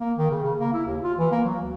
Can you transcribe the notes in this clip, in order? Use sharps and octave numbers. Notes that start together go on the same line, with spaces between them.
A#3
D#3
C#3
C#3
A#3
E4
D#2
F4
E3
A#3
F#3
D2